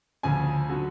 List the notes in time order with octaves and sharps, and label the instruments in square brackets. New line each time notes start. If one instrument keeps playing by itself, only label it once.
[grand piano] D2 C#3 F3 G#5
D3 F#3